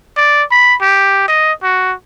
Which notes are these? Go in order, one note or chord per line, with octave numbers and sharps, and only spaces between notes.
D5
B5
G4
D#5
F#4